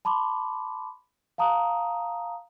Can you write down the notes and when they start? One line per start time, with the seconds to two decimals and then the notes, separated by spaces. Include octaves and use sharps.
0.05 A5 B5 C6 D6
1.38 F5 A5 A#5 D#6